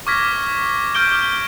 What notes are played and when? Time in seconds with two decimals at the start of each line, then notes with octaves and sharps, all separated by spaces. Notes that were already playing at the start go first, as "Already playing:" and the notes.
0.07 C#6 D6 F6 G#6 A#6 B6
0.95 D6 F6 G6 D7 G7